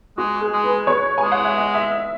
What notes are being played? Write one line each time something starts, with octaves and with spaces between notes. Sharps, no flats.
G#3 F#4
G#4
G#3
B4
C#5
G#3 G#5
F#5
E5
D#5
E5